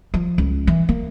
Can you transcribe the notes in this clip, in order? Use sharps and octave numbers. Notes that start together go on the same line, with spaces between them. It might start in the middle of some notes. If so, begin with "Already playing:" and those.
F3
C#2
E3
A#3